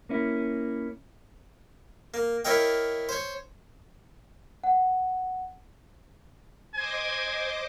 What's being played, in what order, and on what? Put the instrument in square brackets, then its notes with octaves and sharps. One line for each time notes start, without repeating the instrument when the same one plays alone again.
[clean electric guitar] A#3 C#4 E4
[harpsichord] A#3
E4 A#4 C#5 D#5 F5 G5
C5 C#5
[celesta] F#5
[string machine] C5 D#5 D6 [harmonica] G#5